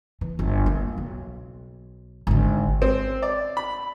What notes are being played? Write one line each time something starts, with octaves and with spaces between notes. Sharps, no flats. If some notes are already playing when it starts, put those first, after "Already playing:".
E3
G1
A#3
B1
G#1 D3
C4
D5
B5